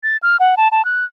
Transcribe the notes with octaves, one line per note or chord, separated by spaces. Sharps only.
A6
F6
F#5
A5
A5
F#6